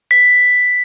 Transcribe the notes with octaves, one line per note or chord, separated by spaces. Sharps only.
B6